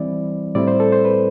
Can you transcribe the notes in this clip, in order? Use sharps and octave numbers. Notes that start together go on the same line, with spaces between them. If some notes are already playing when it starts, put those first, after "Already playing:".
Already playing: E3 G3 C4 E4 D5
A2 G3 C4 E4 D5
C5
A4
C5
B4